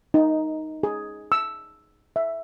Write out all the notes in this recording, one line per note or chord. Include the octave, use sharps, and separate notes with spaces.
D#4
G#4
E6
E5